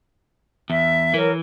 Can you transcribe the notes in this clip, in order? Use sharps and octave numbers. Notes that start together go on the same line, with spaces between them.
E2 E5
E3 F#3 A#4